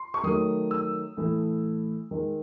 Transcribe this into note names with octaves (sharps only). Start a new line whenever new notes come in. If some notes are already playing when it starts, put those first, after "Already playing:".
Already playing: C6
C#6
D#3 F#3 A3 D#6
E6
A2 E3 A3
D#3 G#3